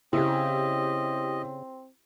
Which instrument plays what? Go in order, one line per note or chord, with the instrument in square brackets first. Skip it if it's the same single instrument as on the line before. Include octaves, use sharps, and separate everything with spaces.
[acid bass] C#3 [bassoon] C4 [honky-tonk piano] E4 G4 [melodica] D#5